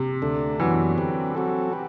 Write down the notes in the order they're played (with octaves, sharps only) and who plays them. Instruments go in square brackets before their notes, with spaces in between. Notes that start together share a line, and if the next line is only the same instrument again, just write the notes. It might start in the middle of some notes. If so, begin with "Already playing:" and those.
Already playing: [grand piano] C3
[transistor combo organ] D2 D3 A3 D4 A4
[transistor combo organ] F#2 F#3 B3 D4 F#4 [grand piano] E3
[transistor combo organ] D3 F#3 C4 G4 B4
F#3 C4 F#4 A4
G4 B4